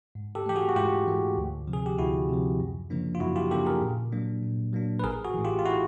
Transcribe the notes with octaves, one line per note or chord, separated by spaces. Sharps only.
G#2
G4 A4
E3 A3 G4
F#4 G#4
F#4
G#2 F4 G4
E3 A3
D2
C3 F3
G#4
G4
D2 E4 F#4
C3 F3
F#2
C#3 F3 A#3 D4
F4
F#2 E4 F#4
F4 G4
C#3 F3 A#3 D4 G4 A4
G#4 A#4
A#2
F#3 A#3 D4
A#2
F#3 A#3 D4
B4
A1 G#4 A#4
F#4 G#4
A2 E3
F4 G4
F4
E4 F#4